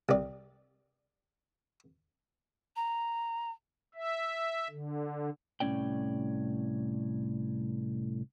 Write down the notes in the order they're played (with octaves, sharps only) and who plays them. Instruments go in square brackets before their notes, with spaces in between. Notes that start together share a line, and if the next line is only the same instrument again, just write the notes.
[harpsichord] C2 D5
[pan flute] A#5
[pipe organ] E5
D3
[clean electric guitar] C2 A2 C4 C#4 D5 G5